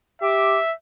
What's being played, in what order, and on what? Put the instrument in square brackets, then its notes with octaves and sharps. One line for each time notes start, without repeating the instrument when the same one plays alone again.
[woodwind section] G4 D6 [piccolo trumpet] E5